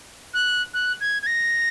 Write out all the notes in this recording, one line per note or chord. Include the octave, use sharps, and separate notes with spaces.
F#6
F#6
G#6
G#6
A#6